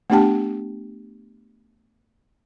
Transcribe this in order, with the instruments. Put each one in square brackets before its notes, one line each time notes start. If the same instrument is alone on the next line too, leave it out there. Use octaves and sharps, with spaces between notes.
[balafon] A3 B3 D4 G4 G5 A5